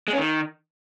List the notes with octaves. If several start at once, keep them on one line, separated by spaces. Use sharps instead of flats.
G#3
C#4
D#3